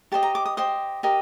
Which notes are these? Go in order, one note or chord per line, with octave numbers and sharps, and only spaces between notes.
G4 C5 D#5 A5
A#5
D6
D#6
G4 C5 D#5 D#6
G4 A#4 D#5